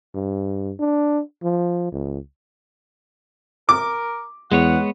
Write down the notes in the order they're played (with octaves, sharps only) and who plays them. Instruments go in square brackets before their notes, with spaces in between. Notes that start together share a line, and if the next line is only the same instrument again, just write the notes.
[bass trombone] G2
D4
F3
C#2
[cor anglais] A#4 [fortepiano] D6
[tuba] E2 [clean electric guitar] G#3 B3 C#5 [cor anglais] F#5